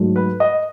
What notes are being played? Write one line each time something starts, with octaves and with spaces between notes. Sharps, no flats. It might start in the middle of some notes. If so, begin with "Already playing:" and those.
Already playing: G#2 F#3 A3
B4
D#5